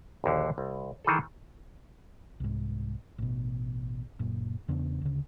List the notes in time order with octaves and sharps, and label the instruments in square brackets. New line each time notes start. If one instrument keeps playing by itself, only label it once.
[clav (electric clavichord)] A#1 D#2 D3
C2
D#3 E3 G#4 A4
[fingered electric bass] C2 G#2
A1 B2
F#1 A#2
E2 C#3 B3 D4
D2 C#3